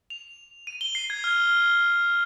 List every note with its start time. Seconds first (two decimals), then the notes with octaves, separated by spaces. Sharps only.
0.10 F7
0.67 D#7
0.81 G7
0.95 C7
1.10 G#6
1.24 F6